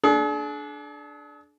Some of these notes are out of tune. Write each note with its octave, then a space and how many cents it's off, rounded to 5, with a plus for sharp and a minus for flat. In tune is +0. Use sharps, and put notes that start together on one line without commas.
D4 +0 G#4 +45